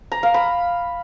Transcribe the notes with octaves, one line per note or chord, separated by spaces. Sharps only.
A#5
F5
B5